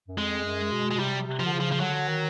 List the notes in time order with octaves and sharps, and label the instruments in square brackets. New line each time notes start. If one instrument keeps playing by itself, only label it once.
[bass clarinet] F#2
[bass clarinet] F2 [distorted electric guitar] G#3
[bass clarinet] F#2
B2
[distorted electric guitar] G#3
[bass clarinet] B2
[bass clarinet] C3 [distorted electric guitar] G3
[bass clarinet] C3
[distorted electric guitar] F3
[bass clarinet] D3
C#3
[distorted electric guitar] F3
F3
[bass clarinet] D3 [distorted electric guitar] F#3
[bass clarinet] D#3